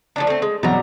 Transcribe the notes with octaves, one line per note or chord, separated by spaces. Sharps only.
F3 A3 D4
A3 C4
G#3
B2 F#3 G3 A#5